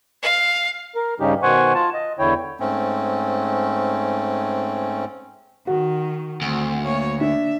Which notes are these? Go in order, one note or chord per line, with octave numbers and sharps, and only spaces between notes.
F5
A#4
G2 C#3 G3 C#4 D#4 G4
B2 D#3 C5 F#5 G#5 C#6
F4 A5
D#5
E2 D3 E4 C#5 G5
G#2 A3 C4 C#4
D#3 F#4
D2 A3 C4
A#3 C#5
D4 E5